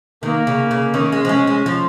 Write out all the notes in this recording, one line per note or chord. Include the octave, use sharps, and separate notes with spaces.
D#3 A#3
C#3
C#3
D#3 C#4
G#3
F3
G#3 C#4
G#3
F3